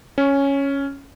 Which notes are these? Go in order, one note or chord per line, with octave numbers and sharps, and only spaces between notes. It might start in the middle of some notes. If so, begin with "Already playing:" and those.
C#4